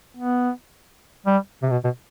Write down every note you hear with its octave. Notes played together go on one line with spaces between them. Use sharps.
B3
G3
C3
B2
B2